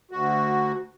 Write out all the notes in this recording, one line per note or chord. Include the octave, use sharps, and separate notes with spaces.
D2 F#4